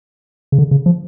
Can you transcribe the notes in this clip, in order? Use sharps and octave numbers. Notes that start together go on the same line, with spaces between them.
C#3
D3
C#3
F3